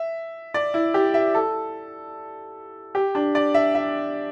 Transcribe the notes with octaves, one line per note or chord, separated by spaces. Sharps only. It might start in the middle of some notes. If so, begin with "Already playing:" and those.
Already playing: E5
D5
E4
G4
E5
A4
G4
D4
D5
E5
E5